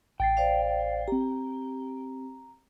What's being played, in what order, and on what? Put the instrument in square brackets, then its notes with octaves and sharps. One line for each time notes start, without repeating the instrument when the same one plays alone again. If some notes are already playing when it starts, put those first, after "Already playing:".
[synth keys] A1 A6 C7 [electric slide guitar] G5
[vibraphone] C5 D5 F5
[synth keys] C4 G4 [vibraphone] A#5